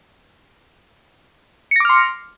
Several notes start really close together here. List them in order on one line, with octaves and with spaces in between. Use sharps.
C#7 A#6 D6 F6 C6